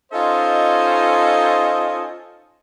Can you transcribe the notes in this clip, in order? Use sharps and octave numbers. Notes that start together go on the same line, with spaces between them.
C#4 D#4 F4 A4 C5 D#5